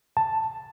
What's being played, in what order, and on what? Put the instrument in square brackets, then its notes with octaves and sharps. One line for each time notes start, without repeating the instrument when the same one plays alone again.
[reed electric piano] A5